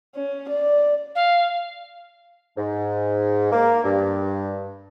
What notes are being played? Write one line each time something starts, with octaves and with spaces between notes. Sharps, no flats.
C#4
D5
F5
G#2
A#3
G2